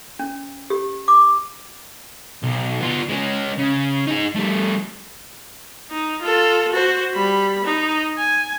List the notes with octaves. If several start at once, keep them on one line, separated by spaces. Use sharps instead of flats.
C#4
G4
D6
B1
B3 F4
G#3 C#4
C#3
D#4 G#4
G3 A3
D#4
F4 A4
F#4 C5
G3 B5
D#4
G#5